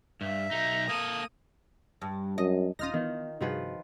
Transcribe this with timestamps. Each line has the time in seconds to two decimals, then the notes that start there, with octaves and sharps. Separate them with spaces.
0.21 G2 E5
0.51 B1 D#4 A#5
0.89 A#3 A4 D#6
2.02 G2
2.38 F#2 D#5
2.79 D#1 C#4 D#4 F4 D#6 F6 A#6
2.94 D#3 E3 B3
3.41 G2 C3 D#3 F3 F#4 G#4 B4